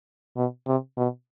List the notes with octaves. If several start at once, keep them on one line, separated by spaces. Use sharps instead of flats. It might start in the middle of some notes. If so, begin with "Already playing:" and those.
B2
C3
B2